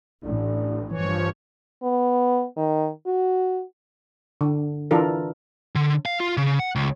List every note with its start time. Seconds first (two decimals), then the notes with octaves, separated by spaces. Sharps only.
0.24 A1 D4
0.91 G2 E3 F3 C#5
1.83 B3
2.57 D#3
3.06 F#4
4.41 D3
4.91 E3 D4 F4 A4 A#4
5.76 D3
6.06 F5
6.20 F4
6.37 C#3
6.59 F#5
6.76 C#2